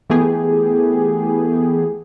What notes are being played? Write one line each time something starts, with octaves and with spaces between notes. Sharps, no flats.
E3 A3 B3 G4 G#4